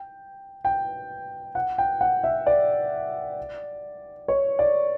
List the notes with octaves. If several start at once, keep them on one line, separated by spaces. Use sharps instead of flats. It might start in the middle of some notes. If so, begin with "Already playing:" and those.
Already playing: G5
G5
F#5
G5
F#5
E5
D5
C#5
D5